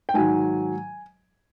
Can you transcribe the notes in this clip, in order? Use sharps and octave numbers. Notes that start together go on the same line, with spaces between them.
G5
G#2 D#3 F#3 G#5